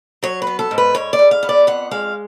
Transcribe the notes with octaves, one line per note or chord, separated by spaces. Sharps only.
F#3 C#5
B4
B3
A4
G#2
B4
G#2 C#5
D5
G#2
F5
B3
D5
F2 F#5
G#3 F5